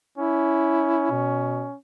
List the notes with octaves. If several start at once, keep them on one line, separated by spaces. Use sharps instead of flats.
C#4 E4
B2